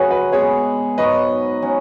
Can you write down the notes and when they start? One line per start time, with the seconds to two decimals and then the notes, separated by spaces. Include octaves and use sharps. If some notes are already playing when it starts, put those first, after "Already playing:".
Already playing: F#2 C#3 F#3 F#4 G#4 B4
0.10 F#4 B4
0.32 B2 G#3 B3 G#4 C#5
0.98 G#2 F#3 B3 F#4 B4 D#5
1.62 F#3 C#4 F#4